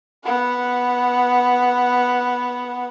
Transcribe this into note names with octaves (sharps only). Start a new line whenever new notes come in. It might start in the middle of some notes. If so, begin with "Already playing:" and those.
B3 F#5